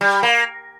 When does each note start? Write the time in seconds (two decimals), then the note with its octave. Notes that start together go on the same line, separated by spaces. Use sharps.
0.01 G3
0.23 A#3